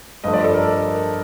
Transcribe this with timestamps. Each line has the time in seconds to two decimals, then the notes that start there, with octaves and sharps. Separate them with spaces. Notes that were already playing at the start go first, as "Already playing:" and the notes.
0.24 G2 F3 A3 D#5
0.33 D5
0.44 A4
0.54 A#4